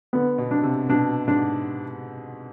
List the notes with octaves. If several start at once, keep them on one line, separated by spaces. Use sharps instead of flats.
D3 B3
B2
D4
C3
B2 D4
G#2 D4